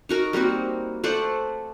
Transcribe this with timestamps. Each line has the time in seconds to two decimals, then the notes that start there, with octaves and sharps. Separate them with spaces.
0.09 D#4 F#4 A#4
0.33 G3 A#3 C4 F#4
1.04 A3 C5 D5 F#5